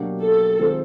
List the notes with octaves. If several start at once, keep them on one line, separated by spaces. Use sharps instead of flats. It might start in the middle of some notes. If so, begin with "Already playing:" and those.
Already playing: B2 F#3 A#3 D4 G4
A4
D#3 G#3 C4 F4